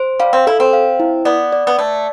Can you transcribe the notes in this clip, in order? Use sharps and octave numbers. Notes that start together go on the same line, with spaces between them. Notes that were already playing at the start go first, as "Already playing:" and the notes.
Already playing: C5
G3 F5
C4
E4 A4
C4
F5
E4
B3 D5
D5
B3
A3 D5